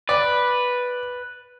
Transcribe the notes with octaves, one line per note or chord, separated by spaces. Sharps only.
B4 D5